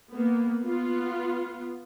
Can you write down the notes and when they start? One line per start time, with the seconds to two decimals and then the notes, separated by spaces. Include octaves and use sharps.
0.12 A#3 B3
0.64 B3 F4